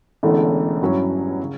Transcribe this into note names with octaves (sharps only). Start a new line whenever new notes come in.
E1 E2 D3 A3 C#4
G2 F#3 C#4 E4
C#3